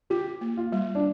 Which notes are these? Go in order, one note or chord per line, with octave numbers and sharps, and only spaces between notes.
F4 G4
A#3
F4
G3
D4